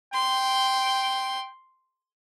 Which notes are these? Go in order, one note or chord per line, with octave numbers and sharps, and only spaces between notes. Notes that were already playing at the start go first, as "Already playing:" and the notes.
G5 C6